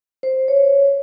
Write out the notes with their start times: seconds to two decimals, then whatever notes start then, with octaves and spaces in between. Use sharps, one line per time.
0.23 C5
0.48 C#5